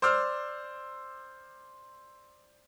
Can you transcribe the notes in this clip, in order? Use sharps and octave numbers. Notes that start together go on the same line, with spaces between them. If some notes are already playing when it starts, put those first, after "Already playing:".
C5 D5 D6 E6 F6